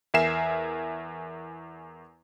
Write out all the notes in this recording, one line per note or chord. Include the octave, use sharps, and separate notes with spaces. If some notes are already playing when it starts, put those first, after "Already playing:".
E2 A#4 E5 G#5 C7 E7